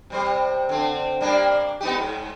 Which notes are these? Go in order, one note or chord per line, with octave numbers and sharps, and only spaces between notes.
C3 G3 C5
D3 C4
G3 A#3 D4
B3 D#4 G4
G#2